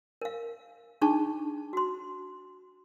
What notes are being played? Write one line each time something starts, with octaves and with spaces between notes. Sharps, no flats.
A#4 F5
D4 D#4 G#4 A5 C#6
F#4 C6